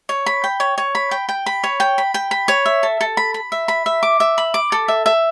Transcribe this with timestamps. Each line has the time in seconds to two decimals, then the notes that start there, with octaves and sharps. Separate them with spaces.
0.09 C#5
0.26 B5
0.44 G5
0.60 C#5
0.78 C#5
0.95 B5
1.11 G5
1.29 G5
1.46 B5
1.64 C#5
1.80 G5
1.98 B5
2.14 G5
2.31 B5
2.48 C#5
2.66 E5
2.83 A4
3.01 A4
3.17 B5
3.34 B5
3.52 E5
3.68 B5
3.86 E5
4.03 D6
4.20 E5
4.38 B5
4.54 D6
4.72 A4
4.88 E5
5.06 E5